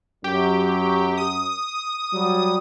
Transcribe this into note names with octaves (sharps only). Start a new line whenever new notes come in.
F#2 F#3 G4
D#6
F#3 G3